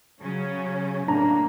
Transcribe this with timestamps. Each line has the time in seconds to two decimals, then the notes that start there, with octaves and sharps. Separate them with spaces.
0.21 C#3 F#3 C#4
1.08 A2 A#3 D4 A#5